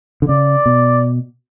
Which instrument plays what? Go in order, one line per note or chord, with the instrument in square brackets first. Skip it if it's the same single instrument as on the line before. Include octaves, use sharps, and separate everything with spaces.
[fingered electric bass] D3
[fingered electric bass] C#3 [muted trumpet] D5
[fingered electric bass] B2